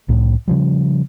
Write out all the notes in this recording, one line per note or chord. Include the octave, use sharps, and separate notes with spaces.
C2 A2
C#3 F3 G3